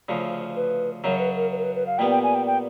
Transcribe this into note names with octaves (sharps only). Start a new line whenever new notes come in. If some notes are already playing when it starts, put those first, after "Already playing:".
D2 C#3 F3
B4
F#2 C#3 F#3 C#5
B4
A#4
B4
A#4
B4
B4
F5
A#2 G3 B3 G5
G5
G#5
G5
G5